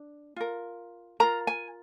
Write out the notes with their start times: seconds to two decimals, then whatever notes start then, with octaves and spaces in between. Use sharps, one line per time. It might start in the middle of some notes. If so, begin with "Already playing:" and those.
Already playing: D4
0.36 F4 A#4
1.20 F4 A#4 A#5
1.47 G#5